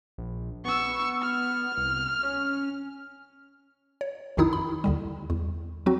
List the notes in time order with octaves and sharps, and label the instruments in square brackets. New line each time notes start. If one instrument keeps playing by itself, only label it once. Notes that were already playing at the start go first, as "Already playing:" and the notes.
[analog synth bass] A#1
[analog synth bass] B3 [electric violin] C#6 E6
[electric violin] F6
[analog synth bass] C2
C#4
[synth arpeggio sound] C#5
A#1 F2 D#3 D#4 E4 D#6
B5
D#2 D3 G3
E2
F#3 C4 F#4